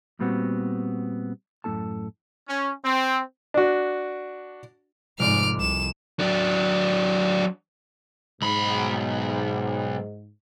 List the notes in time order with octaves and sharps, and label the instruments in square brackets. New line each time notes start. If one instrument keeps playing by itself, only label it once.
[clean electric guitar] A#2 G3 B3 C4 F#4
F#2 A2 A3 C#4 A4 A5
[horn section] C#4
C4
[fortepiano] D4 F#4
[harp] F1 D6 [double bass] G#2 [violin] F6 D7
[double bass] C2 [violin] E7
[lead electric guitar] F#3 D4
[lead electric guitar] B1 B5 [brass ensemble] G#2